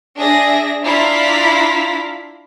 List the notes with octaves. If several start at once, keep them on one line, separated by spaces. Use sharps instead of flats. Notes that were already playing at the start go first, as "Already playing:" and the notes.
D4 G#4 E5 A#6
D4 E4 F4 F5 A#5 B6